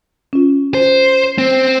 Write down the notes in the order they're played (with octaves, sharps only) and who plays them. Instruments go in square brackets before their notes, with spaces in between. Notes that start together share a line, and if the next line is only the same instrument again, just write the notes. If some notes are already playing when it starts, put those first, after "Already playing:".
[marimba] C#4 F4
[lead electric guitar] C5
C4